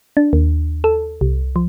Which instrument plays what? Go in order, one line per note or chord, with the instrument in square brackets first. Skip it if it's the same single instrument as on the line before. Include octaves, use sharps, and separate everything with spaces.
[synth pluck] D4
D#2
A4
C2
F3